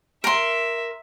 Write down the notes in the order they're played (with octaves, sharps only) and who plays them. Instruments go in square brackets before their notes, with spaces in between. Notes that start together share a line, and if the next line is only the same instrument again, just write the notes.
[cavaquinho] A#4 C6 [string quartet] E5